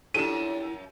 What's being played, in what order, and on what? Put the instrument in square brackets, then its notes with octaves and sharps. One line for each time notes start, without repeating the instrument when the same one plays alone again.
[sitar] F#2 F3 [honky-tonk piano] D4 G4 A4 [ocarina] E4 [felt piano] D#7 E7